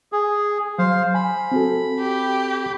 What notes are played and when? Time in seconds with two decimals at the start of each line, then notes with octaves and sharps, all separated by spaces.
0.12 G#4
0.79 F#3 C5 F5
1.14 G#5 B5
1.52 C4 F#4 A4
2.00 G4